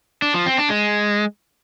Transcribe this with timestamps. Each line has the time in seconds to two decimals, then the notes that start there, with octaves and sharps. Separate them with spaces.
0.22 D4
0.34 F3
0.46 C4
0.58 D4
0.70 G#3